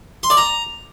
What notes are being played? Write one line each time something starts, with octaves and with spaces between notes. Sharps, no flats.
C6
D5
A#5